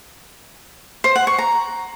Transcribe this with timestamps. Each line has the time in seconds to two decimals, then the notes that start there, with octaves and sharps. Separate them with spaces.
1.04 C5
1.16 F#5
1.27 C#6
1.38 A#5